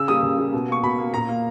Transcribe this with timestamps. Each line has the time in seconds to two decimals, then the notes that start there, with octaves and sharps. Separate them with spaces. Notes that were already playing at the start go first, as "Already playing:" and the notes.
Already playing: C#3 E6
0.08 G3 A#3 D#6
0.23 C#3
0.38 G3 A#3
0.53 B2
0.68 A#3 C#6
0.83 B2 B5
0.98 A#3
1.14 A#2 A#5
1.29 A#3